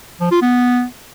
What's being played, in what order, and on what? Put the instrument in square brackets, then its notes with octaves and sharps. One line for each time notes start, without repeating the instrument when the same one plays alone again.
[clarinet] F3
F4
B3